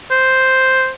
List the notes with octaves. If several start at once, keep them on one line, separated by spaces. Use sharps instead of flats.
C5